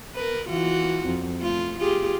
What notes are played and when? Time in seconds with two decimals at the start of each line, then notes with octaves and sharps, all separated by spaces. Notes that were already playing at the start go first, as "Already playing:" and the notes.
0.15 A#4 B4
0.48 E3 F4 F#4
1.06 F2
1.40 A3 F4
1.78 F4 G4 G#4